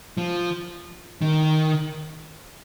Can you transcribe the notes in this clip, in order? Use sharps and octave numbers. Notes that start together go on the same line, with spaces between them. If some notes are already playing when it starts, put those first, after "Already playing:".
F3
D#3